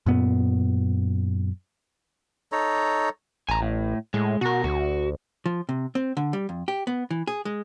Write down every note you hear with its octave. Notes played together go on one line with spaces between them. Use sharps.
F#2 A#2 B3
D#4 A4 C#5 A#5
A1 G#5 A#5
A2
A2 G#3
B2 F#4 A#4
D2 F#4
F3
C3
C4
D3
G3
F2
G4
B3
E3
G#4
G#3